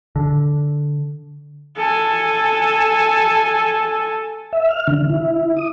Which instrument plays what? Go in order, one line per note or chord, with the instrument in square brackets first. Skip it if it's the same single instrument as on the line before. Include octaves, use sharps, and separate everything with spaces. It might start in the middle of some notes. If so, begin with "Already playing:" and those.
[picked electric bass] D3
[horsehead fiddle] A4 G#5
[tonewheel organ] E5
F6
D3
E4
D#6